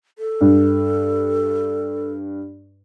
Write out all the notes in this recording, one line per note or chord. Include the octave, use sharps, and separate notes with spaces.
A4
G2